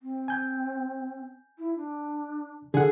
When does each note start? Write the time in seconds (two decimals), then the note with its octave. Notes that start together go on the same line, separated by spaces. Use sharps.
0.02 C4
0.28 G#5 G6
1.58 E4
1.76 D4
2.74 D3 G#4 A4 F#5